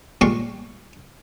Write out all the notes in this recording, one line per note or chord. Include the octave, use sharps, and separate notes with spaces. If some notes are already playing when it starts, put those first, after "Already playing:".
A#2 G3 G#3 F5 C#6